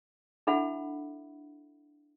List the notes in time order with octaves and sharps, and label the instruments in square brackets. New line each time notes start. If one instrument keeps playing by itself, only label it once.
[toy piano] D4 E4 A4 E5 F#5 B5